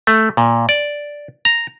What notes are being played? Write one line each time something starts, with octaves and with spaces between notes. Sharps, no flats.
A3
A#2
D5
A#5